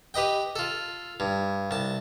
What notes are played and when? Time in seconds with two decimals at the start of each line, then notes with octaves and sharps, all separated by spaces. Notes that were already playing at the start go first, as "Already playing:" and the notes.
0.14 G4 B4 D#5 G5
0.56 F4 A4
1.20 G2
1.71 C2 A5